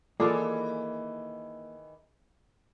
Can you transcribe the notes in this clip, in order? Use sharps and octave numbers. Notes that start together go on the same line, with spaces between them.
D#3 E3 A#3 F4 G#4 A4 D5